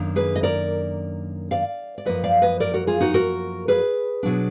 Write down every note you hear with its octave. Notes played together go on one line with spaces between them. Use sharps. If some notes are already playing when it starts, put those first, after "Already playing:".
Already playing: F#2 D#3 A#3 D4
G#4 B4
D#5
A#4 D5
D5 F5
D5
F#2 F3 A#3 B4 D#5
D5 F5
B4 D#5
A#4 D5
F#4 A#4
F4 G#4
D#4 F#4
F#4 A#4
G#4 B4
B2 F#3 D4